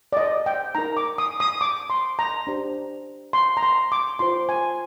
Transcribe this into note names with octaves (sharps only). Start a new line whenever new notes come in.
D5
D#5
G5
D#4 A#4 A#5
D6
D#6
D#6
D6
C6
A#5
D4 G4 C5
C6
A#5
C6
D6
F4 C5 C6
G#5